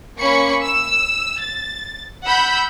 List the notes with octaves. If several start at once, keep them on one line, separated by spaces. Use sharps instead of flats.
A#3 C#4 B5 C#6 C#7
E6
A6
F#5 B5 E6 G6